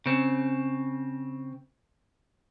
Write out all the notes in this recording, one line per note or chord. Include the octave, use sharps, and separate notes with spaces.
C#3 C4